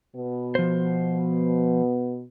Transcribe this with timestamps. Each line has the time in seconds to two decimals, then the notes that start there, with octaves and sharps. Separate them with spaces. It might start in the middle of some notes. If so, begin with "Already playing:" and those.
0.16 B2 B3
0.55 F3 C5